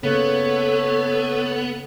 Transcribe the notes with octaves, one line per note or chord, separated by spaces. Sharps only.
C#3 A#3 B3 A4 C#5